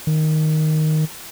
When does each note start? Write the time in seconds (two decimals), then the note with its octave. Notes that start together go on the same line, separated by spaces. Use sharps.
0.07 D#3